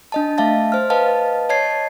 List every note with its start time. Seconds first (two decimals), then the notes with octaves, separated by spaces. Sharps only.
0.12 D4 D#5 A5
0.38 A3 E5 F5 A5 A6
0.72 C5 F6
0.90 B4 D#5 F5 A5
1.49 C#5 D#5 A5 G#6 C7